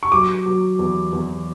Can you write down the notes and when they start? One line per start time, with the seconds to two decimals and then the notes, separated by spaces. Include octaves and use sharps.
0.03 C#6
0.12 F#3 D6
0.46 F#3
0.79 E2
1.12 E2